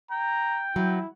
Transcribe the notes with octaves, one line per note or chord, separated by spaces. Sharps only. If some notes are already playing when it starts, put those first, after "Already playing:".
G5 A#5
F#3 E4